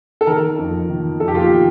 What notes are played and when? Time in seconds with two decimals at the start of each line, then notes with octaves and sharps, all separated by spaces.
0.21 A4
0.27 D#3 A#4
0.58 F2
0.89 D#3
1.20 F2 A4
1.28 G4
1.35 F4
1.42 G4
1.52 D#3